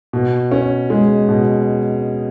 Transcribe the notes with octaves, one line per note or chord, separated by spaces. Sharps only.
B2
C#4
G#3
B2